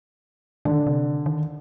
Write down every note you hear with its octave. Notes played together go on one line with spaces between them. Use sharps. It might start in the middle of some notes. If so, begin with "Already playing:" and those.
D3 D#3
C3
D#3